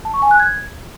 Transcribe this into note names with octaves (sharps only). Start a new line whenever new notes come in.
A5
C#6
G#5
F#6
G#6